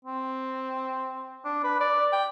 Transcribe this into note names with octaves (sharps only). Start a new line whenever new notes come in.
C4
D4
B4
D5
G5